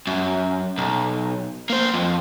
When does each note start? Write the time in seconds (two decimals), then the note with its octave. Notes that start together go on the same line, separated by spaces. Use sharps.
0.07 F#2
0.78 B1
1.70 A#3 C5
1.94 F2